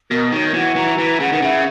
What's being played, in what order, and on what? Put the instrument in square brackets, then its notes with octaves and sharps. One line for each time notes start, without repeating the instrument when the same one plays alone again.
[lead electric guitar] B2 [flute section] A#4
[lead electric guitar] D#3 [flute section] C#5
[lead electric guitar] E3 [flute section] F#4
[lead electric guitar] E3 [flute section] A#5
[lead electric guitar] E3 [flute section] B4
[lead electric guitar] C#3 [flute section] F#5
[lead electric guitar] D#3
[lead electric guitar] C#3 [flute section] E4